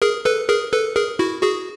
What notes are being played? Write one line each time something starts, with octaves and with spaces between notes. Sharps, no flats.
G#4 A#4
A4 B4
G#4 A#4
A4 B4
G#4 A#4
E4 F#4
F#4 G#4